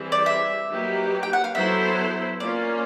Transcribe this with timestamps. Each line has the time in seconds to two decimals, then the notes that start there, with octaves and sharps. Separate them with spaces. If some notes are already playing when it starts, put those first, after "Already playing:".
Already playing: E3 G3 C4 E4 G#4
0.12 D5
0.26 E5
0.69 F#3 A#3 D#4 G4 B4
1.23 G5
1.33 F#5
1.44 F5
1.55 F#3 B3 E4 A4 C5 E5
2.40 A#3 C#4 F4 D5